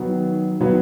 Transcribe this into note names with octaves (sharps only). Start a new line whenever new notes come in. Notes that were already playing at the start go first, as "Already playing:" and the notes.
Already playing: D#3 F#3 B3
D#3 F#3 B3